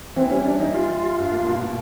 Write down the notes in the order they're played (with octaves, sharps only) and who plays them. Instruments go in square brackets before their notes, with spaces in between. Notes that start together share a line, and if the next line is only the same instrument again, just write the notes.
[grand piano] E3 [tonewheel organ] C4
[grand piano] G3 [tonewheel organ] C#4
[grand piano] G3 [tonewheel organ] D4
[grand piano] E3 [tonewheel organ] D#4
[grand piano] G3 [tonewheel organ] F4
[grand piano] E3
G3
G2
A#3
B2
B2